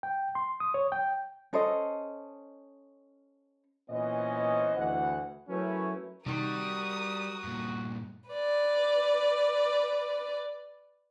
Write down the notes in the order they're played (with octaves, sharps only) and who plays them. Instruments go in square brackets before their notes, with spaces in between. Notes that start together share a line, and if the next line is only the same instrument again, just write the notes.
[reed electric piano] G5
C6
D#6
C#5
G5
[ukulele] C#4 A4 C5 D#5
[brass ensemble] A#2 E3 B3 C#4 C5 D#5
D2 E3 F#5
F#3 A3 C#4 E4 A#4 B4
[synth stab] C3 D#3 [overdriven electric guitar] G3 [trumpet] F#4 [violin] A#4 D#6
[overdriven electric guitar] G2 A#2
[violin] B4 D5